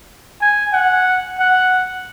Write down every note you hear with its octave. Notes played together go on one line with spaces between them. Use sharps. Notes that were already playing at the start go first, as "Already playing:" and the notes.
G#5
F#5
F#5